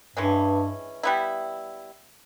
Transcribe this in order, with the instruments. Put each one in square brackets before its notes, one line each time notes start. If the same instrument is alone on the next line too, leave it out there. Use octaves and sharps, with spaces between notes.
[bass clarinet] G2 [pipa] E3 G#3 C#4
[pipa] G3 B3 E4